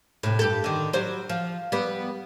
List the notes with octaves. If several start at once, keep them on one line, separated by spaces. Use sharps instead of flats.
A2 C3
G2 G4 A4
D3 D#3
F#3 G3 C5
F3
G3 B3